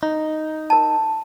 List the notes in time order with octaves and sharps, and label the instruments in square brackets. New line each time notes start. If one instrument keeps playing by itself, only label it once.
[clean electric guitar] D#4
[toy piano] A#4 A5